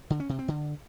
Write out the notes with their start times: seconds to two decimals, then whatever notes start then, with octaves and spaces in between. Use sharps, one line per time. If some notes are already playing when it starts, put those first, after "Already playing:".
0.10 D3
0.20 C#4
0.29 C3
0.39 C4
0.48 D3